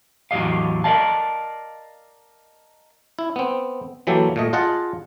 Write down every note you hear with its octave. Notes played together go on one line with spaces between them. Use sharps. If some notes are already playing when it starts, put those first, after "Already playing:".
E2 A2 F#3 G4 D#5 F5
A#4 B4 D5 D#5 F5 A5
E4
B3 C4
E3 F#3 A#3 G4 A4
A#2 A3 D#5
F4 G#4 D#5 F#5 A5